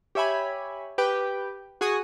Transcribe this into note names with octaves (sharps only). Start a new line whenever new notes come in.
G4 C#5 E5 G#5 B5
G4 B4 G5
F#4 G#4 G#5 C#6 D#6